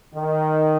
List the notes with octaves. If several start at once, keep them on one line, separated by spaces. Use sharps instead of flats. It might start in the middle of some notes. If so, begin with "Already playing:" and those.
D#3